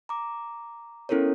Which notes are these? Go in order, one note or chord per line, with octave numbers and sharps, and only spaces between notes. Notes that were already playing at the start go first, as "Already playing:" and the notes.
A#5 D6
B3 C#4 E4 A4 A#4 C#5